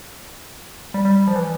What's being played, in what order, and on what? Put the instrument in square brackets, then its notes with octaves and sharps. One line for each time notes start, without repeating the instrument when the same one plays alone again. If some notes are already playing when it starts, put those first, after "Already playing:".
[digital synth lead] G3
G3
F3
E3